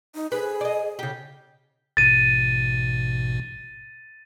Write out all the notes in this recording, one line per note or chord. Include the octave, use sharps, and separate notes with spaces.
D#4
G#4 B4
D5 D#5
C#3 G4
A1 G#2 B2 A6 D#7